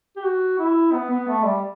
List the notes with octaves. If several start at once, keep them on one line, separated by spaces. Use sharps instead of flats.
G4
F#4
E4
B3
B3
A3
G3